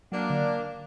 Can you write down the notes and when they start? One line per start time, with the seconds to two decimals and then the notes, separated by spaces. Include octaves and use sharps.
0.12 F#3 A#3 D4
0.30 D3